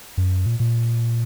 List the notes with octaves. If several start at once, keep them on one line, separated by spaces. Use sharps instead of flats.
F#2
A#2
A#2